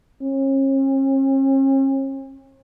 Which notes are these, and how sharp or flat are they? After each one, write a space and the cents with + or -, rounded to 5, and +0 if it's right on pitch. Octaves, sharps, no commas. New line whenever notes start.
C#4 -45